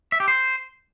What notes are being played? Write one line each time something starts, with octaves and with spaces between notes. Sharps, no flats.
E5
G4
C5